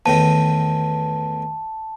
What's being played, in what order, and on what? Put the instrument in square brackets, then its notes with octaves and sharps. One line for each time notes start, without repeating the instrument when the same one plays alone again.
[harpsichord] E2 A2 D#3 [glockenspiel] A5